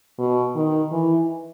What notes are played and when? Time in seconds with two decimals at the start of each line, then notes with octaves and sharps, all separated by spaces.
0.18 B2
0.56 D#3
0.92 E3